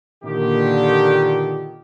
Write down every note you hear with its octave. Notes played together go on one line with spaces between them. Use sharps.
A#2 D3 D#3 G4